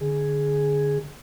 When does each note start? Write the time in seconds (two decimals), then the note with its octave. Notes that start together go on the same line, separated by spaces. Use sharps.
0.01 D3 G#4